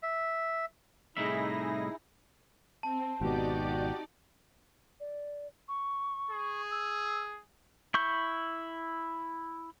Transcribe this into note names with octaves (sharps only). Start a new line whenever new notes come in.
E5
C2 A2 D#4 E4 G#4 E5 A#6
C4 A5
G#1 B2 D#4 F#4 G4 D5 D6
D5
C#6
G#4
E6
E4 C#6 G6